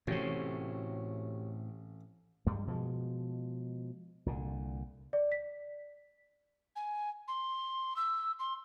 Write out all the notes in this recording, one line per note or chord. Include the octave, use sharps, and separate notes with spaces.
A1 A2 C3 F#4 G4 C#5
G2 G3 G#3
B2 F3 G#3
C2 A#2 D3
D5
B6
G#5
C6
E6
C6